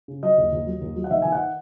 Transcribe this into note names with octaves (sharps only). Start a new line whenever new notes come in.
C#3
F#3 D#5
D#2
D#2
F#3
D#2
F#3
F#5
D#3 E5
D#3 G#5
F#5